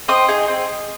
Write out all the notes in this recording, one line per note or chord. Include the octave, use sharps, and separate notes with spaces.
C4 D#5 D#6
D#4 G#4
C4